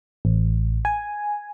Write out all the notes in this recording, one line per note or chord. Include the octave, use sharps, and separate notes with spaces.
A1
G#5